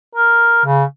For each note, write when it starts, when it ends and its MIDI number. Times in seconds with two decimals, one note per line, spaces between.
0.15 0.62 70
0.65 0.84 49